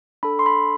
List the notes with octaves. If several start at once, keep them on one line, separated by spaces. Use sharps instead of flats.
D4 A4 B5
C6
B5